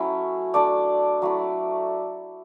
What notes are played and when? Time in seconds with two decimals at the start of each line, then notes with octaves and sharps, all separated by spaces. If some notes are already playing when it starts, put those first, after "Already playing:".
Already playing: F#3 A3 C#4 E4
0.54 A3 D4 D5
1.22 F#3 A3 E4